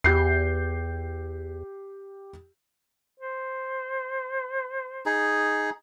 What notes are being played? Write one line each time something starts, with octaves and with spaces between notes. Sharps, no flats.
E2 G4 G6 C7
C5
D#4 G#4